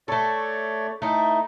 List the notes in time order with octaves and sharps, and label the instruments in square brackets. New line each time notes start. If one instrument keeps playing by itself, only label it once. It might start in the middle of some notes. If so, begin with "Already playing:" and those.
[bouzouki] A3 A4 [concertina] C#5 D5
[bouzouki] A3 E4 [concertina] D#4